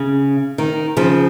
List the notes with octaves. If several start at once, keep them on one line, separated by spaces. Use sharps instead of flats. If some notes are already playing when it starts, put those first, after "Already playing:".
Already playing: C#3
D#3
C#3 F3